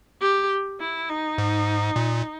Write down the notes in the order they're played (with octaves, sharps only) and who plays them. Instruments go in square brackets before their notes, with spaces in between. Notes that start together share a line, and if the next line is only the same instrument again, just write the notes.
[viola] G4
E4
D#4
[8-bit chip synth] G#2
A#2